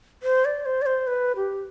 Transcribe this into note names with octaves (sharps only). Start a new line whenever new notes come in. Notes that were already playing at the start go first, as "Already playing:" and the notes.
C5
D5
C5
D5
C5
B4
G4